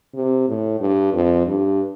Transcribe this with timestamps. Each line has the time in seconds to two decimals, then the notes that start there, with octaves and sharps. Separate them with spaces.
0.15 C3
0.48 A2
0.81 G2
1.13 F2
1.47 G2